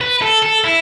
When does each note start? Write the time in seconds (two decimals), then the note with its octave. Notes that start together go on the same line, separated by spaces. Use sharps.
0.01 B4
0.22 A4
0.43 A4
0.64 E4